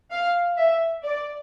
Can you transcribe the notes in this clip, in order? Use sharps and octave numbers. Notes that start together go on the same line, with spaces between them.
F5
E5
D5